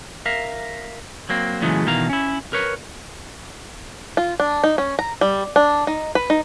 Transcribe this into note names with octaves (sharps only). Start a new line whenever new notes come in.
A#4 E5 F5
F#3 A#3 C4
A#2 C#3 E3 F#3 G#3 A3
B2 D#3 E3 F5 A#5
C#4 E4
A#4 B4 C#5
F4
D4
D#4
C#4
A#5
G3
D4
D#4
B4
D#4